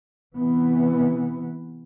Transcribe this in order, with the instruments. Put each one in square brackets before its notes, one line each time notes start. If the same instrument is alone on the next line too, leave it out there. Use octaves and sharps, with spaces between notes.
[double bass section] C3 E3 B3